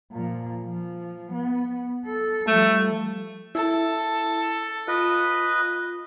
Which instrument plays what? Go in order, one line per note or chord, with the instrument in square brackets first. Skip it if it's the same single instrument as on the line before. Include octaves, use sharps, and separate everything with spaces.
[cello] A#2 F3
F3
B3
A4
[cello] F3 G3 [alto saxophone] A3
[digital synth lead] E4 [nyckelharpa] A4
[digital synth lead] F4 [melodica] B4 D#5